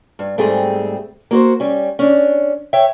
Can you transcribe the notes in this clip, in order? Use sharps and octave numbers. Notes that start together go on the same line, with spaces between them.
G2
G#2 G3 A3 C4 G#4
A#3 F#4 C5
G3 C#4
C#4 D4
C#5 E5 G5